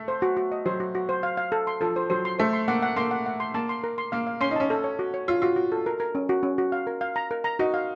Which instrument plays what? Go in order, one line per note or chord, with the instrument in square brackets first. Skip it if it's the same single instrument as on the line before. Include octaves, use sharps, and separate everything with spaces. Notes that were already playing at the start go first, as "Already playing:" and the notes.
Already playing: [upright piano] A3
[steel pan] C5
F#4
F#4
D#5
[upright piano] F#3 [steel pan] C5
[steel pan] F#4
F#4
C5
F5
F5
A4
C6
[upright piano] F3 [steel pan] A4
[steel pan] C5
[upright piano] F#3 [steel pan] C5
[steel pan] C6
[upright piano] A3 [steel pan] C5
[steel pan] C6
[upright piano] A#3 [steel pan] F#5
[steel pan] F#5
[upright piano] A#3 [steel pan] C6
[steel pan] F#5
F#5
C6
[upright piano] A#3 [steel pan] A5
[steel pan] C6
A#4
C6
[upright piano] A#3 [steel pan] F5
[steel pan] F5
[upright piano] C#4 [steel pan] C6
[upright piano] D#4
[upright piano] C#4 [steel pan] A5
[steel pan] A4
C#5
F#4
C#5
[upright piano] F4 [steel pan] C#5
[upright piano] F4 [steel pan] F#4
[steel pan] F#4
A4
A#4
A#4
C#4
F#4
C#4
F#4
F5
A#4
F5
A#5
A#4
A#5
[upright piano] D#4 [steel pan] F#4
[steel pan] F5